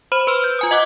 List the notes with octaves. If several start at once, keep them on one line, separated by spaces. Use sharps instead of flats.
C5 B5 F#7
B4 C6 E6 F6
G6
F4 G#5 D#6
D#5 F#5 D6 F#6